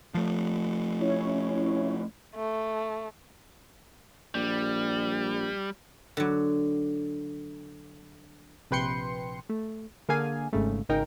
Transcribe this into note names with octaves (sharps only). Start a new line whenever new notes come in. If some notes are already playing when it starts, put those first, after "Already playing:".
F3 A3
C#4 E4 C#5
A3
A#1 G3
D3 F#3
A#1 C3 B4 G5 C6 C#7
A3
D3 A#3 G#4 F5 G#5
G#1 G#2 C#3 A3
G#1 C#3 D#4 A#4 G5